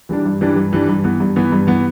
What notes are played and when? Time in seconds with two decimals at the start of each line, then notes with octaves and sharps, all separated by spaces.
0.09 E3 G3 D4
0.25 G2
0.41 E3 G3 D4
0.56 G2
0.73 E3 G3 D4
0.89 G2
1.04 E3 B3
1.20 G2
1.36 E3 B3
1.52 G2
1.67 E3 B3